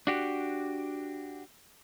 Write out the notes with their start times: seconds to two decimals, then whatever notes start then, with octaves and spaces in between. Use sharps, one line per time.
0.07 D4 F#4 G4